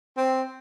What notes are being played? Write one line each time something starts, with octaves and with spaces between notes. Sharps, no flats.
C4